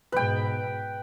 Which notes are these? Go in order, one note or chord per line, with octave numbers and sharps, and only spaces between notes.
G#2 B2 B4 G5